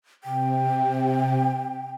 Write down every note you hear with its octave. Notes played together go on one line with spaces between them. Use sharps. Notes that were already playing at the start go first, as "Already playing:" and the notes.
C3 G5